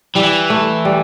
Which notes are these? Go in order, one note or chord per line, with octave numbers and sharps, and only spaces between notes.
E3 G3
A3
G3